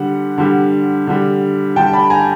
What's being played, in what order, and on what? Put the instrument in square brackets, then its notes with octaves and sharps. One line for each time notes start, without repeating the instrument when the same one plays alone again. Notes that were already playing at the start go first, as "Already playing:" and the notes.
Already playing: [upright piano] D3 G3 F#5
D3 G3
D3 G3
D3 G5 A5
G3
A5 B5
G#5 A#5